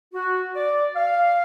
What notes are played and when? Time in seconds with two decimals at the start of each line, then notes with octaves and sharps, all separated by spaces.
0.14 F#4
0.56 D5
0.96 F5